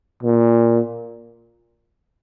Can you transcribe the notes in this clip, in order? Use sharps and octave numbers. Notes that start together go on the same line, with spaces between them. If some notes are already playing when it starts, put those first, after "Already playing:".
A#2